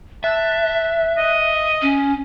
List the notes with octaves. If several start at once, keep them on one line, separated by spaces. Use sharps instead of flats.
E5 A5 F#6
D#5
C#4